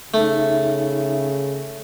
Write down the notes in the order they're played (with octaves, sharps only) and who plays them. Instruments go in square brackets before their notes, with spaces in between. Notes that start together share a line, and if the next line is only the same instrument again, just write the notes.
[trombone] C#3 [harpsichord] A3 [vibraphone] D#4 E5